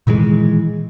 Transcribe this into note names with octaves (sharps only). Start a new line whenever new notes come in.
A#2 D#3 E3 G#3